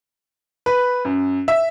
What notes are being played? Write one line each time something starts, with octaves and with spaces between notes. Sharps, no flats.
B4
F#2
E5